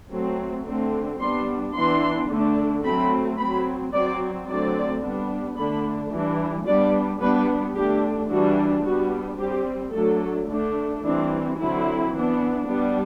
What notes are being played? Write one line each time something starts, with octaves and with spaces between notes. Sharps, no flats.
F#3 A3 C4
D3 A3 C4
G3 B3 D4 C6
E3 B3 D4 C6
D3 A3 D4
F#3 A3 C4 B5
C4 B5
F#3
F#3 C4 D5
D3 F#3 A3 C4 D5
G3 B3 D4
D3 A3 D4 B5
E3 G3 D4
G3 B3 D4 D5
G3 B3 D4 B4
D3 A3 D4 G4
E3 G3 D4 F#4
G3 B3 D4 F#4
G3 C4 G4
F#3 A3 D4 A4
D3 A3 D4
E3 G3 C4 D4
D3 F#3 C4 E4
E3 B3 D4
G3 B3 D4